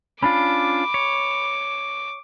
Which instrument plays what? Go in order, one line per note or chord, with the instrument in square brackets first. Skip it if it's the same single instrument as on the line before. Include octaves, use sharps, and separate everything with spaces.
[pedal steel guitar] C#4 D4 F4 [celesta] B5 [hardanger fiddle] D6
[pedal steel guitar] C#5